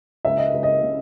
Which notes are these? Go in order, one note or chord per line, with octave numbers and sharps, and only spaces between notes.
C#2 E5
D#5
C#2
D#5
C#3